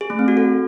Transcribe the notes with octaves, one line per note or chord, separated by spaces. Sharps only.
G#4
A3
C4
F#4
A4